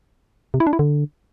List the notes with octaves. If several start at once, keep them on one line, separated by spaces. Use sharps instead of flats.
C3
E4
D4
E4
D3